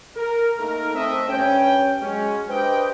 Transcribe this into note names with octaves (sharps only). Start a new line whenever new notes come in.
A#4
A3 A#3 D#4 A4 A#4
A3 C4 D#5 E5
G2 C#4 G5
F#3 G#3 C#4
D4 G4 B4 C5 D#5 G5